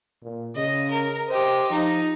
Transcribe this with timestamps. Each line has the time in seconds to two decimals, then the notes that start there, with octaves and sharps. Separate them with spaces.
0.23 A#2
0.56 C#3 D#5
0.90 A#4
1.29 G4 C5 D#5
1.71 F3 D#4